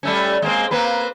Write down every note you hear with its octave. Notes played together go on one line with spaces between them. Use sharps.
G3 A3 C#4
G#3 A#3 C4
A#3 C4 B4